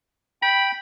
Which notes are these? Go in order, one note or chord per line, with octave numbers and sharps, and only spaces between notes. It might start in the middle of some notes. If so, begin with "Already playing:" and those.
G5 B5